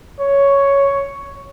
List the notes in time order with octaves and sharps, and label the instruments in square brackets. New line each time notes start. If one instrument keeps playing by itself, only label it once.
[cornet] C#5